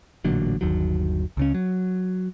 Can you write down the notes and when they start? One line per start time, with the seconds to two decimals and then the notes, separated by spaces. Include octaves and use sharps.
0.25 A1 A#2 D3 F#3
0.61 G1 D#2 D#3 F#3
1.37 C#2 C#3 C#4
1.54 F#3